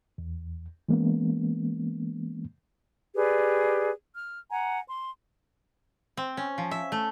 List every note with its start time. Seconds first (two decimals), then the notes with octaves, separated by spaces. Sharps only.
0.18 E2
0.89 E3 G#3 A#3 B3 C#4
3.15 G4 G#4 B4 D5
4.14 F6
4.50 F#5 G#5 A#5
4.88 C6
6.17 C4
6.37 C#4
6.58 F3
6.71 E5
6.92 A3